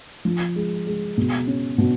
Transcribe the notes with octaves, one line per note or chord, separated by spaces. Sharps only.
F3
G#3
G#3
B2
C#4
B2